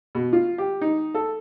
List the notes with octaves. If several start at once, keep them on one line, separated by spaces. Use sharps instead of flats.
B2
F4
G4
D#4
A4